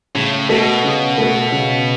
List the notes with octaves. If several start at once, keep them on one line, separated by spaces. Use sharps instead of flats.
A2 C#3
B2 A3 F#4 A4
C#3
A3 F#4 A4
C#3